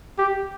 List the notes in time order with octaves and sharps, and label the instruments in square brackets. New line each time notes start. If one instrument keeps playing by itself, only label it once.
[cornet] G4